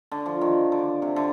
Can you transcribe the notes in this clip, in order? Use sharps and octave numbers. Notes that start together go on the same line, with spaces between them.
D3
F3
D#3
D3
C3
D3